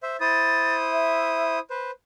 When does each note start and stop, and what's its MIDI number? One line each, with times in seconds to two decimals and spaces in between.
0.03 0.17 72
0.03 0.17 76
0.21 1.59 64
0.21 1.59 72
0.21 1.59 87
0.21 0.75 93
0.93 1.59 76
1.70 1.91 71
1.70 1.91 72